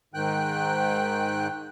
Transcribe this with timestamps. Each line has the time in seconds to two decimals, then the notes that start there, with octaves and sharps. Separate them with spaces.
0.14 G#2 D#3 G5 F#6